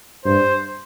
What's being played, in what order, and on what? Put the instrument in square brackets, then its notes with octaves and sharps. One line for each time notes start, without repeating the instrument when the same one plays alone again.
[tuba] G2 [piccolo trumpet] C5